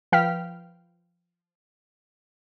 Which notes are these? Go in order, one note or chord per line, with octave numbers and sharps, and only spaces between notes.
F3 B4 F5 G5 F6 B6